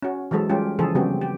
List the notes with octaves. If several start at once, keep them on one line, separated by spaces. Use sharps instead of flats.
C#4 F#4
E3 F#3 G#3 A4 C5
G3 G#3 C#4 F4 G4
C#3 E3 F3 G#4 A4 C5
C#3 G3 B3 C4 F#4 G4
G4